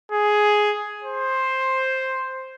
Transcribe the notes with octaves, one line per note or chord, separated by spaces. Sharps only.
G#4
C5